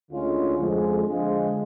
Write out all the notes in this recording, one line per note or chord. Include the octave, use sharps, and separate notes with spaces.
D2 D3 G#3 C#4 F4
F2 D3 F3 G#3
D3 F3 G#3